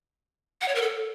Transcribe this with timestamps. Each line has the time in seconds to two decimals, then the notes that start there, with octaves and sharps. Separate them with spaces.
0.61 F#5
0.68 C#5
0.75 A#4
0.82 A4